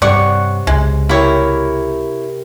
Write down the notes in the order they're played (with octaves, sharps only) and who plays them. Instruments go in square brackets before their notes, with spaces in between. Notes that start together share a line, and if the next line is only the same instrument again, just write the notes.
[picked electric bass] G2 [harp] C3 C#5 [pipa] D5 F#5 [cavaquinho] C#6
[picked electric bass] C#2 [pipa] G#3
[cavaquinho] E4 C#5 [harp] G4 A#4